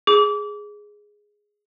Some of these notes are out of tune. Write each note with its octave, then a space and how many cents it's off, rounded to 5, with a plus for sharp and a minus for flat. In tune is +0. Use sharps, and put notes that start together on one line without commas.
G#4 +0 D6 -25